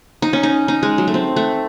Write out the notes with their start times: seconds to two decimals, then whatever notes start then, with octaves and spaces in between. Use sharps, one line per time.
0.22 D#4
0.33 C#4
0.43 D#4
0.68 D#4
0.83 G#3
0.98 F#3
1.08 A3
1.14 C4
1.36 A3